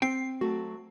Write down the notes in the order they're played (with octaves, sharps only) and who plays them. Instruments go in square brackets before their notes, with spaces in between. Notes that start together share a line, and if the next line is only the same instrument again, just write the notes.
[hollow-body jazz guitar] C4 G5 [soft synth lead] C7
[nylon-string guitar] F#3 A3 [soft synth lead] F#4